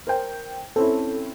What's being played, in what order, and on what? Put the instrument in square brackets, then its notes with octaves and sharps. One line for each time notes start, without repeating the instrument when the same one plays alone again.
[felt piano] A#4 C5 G5
[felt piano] C4 C#4 E4 [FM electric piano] A4